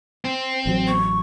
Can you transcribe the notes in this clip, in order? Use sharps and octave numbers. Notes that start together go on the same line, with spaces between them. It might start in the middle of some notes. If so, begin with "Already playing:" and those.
C4
A1 F#3
C#6